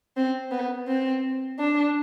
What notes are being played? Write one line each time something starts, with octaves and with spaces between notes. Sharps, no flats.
C4
B3
C4
D4